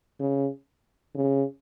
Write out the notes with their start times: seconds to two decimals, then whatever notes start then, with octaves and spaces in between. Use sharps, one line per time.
0.20 C#3
1.15 C#3